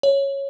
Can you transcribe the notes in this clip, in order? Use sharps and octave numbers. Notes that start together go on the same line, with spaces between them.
C#5